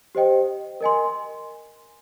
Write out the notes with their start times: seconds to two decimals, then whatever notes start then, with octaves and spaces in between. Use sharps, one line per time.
0.15 G4 C5 D#5 G5
0.81 A#4 D#5 G#5 C6